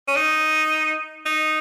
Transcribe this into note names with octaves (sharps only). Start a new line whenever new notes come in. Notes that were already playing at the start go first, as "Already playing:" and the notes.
C#4
D#4
D#4